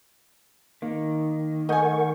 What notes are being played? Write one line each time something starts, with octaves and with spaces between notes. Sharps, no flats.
D#3 A#3
A3 A#4 D#5 F#5 G#5 C#6 G6